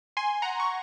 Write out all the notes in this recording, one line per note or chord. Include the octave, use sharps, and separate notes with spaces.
G#5 C6
F#5 A#5
C#6